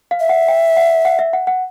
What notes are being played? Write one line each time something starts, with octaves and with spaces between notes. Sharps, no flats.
F5
E5
F#5
G5
F#5
F#5
E5
F#5
F#5